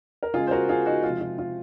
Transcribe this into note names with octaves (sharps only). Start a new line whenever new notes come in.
A#4
C#3 G#3 F4 G#4
C5
F#4 A#4
F4 G#4
D#4 F#4
C3 F3 G#3 F4
F4
F4